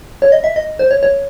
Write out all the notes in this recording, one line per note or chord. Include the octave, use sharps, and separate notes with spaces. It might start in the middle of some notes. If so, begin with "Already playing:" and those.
C#5
D#5
E5
D#5
C5
C#5
C#5